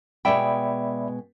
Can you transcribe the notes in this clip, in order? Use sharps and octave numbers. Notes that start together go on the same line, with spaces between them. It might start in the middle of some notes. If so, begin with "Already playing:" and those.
B2 G#3 D5 E5 G5 B5